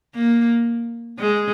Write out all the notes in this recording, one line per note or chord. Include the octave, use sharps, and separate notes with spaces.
A#3
G#3